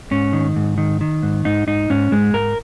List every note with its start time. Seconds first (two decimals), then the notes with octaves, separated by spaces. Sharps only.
0.11 G#2 C#4
0.33 D#3
0.56 G#2
0.78 D#3
1.01 D#3
1.23 G#2
1.45 G#2 D#4
1.67 G#2 D#4
1.90 G#2 C#4
2.11 G#2 G#3
2.34 G#2 A#4